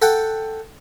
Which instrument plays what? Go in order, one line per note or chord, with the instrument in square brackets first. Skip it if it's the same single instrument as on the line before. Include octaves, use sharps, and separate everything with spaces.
[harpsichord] A4 F#5 G5